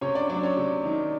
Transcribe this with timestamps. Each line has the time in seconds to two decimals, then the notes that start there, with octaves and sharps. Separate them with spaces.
0.01 C3 C#4 C#5
0.15 D4 D5
0.29 F#3 D4 D5
0.43 C#4 C#5
0.57 C3
0.85 D#3